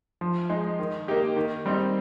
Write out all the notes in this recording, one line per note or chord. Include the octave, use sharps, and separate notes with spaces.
F3
G#3 D#4
D#3
A#3 D#4 G4
D#3
G3 C4 D#4